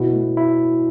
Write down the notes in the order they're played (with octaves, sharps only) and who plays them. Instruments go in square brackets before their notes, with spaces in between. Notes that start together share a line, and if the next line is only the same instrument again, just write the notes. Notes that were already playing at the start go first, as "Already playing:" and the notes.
Already playing: [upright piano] B2 [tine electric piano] E4
[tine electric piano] A3
E4